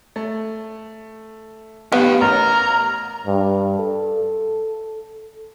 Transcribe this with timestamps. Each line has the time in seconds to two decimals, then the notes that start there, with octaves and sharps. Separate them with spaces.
0.16 A3
1.92 B3 G4 F5
2.21 A1 A#4 A#5
3.26 G2
3.79 A4